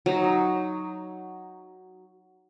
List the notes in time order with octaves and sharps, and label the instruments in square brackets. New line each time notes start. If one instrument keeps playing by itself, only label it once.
[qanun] F#3 D#4